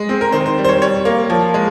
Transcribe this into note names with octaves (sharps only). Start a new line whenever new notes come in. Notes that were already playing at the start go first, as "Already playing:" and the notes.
Already playing: G#3
C4
A#4
D#3 C5
C5
G3
C5
C#5
G3 C#5
A#3
F3
G#3